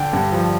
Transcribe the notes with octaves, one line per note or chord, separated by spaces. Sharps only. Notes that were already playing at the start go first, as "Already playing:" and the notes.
Already playing: D3 G5
G2
F3